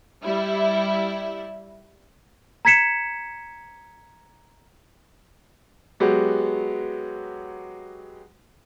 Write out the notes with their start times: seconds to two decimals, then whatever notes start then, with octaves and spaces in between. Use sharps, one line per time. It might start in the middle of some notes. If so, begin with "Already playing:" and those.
0.23 G3 E4
2.65 A#5 G#6 B6 C#7 E7
6.00 F#3 G#3 B3 F#4 G4